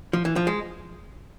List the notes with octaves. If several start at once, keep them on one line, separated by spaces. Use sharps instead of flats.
F3
E3
F3
G#3